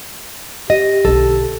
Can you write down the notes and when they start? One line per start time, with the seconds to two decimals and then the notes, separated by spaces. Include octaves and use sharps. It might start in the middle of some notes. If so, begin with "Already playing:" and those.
0.70 G4 D#5
1.05 B1 D3 A4